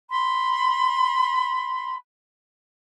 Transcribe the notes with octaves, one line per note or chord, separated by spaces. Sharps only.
B5 C6